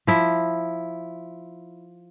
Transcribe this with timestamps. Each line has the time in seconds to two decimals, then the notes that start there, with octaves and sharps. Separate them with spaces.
0.07 F3 E4